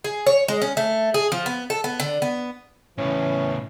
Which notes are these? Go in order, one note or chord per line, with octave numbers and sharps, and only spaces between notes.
G#4
C#5
G#3
C#4
A3
G#4
F3
B3
A4
B3
D3
B3
A2 C#3 E3 C#4